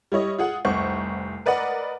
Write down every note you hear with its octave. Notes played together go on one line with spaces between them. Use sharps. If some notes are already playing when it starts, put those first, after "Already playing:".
G3 E4 C#5 D#5
F4 G#4 F#5
F1 C2 C5 F#5 C#6
A#4 B4 D5 D#5 F#5